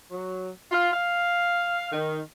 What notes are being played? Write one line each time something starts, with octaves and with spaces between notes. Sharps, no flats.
F#3
F4
F5
D#3